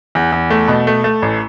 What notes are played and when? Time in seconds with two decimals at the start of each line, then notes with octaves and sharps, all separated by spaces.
0.15 E2
0.32 E2
0.50 A3
0.68 B2
0.87 A3
1.04 A3
1.22 A1